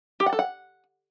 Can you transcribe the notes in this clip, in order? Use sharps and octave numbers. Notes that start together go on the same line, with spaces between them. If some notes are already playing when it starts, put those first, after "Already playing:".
G4
F#5
A4
F#5